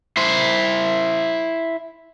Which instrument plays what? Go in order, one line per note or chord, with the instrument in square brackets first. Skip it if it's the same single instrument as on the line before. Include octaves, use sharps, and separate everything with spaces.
[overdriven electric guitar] E4 C5